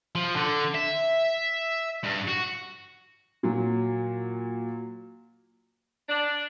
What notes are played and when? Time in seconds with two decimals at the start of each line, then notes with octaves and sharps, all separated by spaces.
0.15 F3
0.36 D3
0.74 E5
2.04 G2
2.28 F#4
3.43 A#2 F#3
6.08 D4